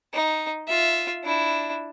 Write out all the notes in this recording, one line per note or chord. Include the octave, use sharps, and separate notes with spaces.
D#4
F4 E5
D4 E4